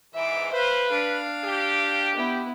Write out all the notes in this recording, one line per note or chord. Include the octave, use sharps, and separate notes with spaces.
G#2 E3 E5 D6
B4 C5 F5
D4 F5
G4
B3 E4